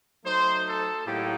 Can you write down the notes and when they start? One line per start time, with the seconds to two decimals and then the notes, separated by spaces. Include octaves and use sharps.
0.24 F#3 A3 D#4 C5
0.66 A4
1.06 A2 F#3 A#3 D#4 G4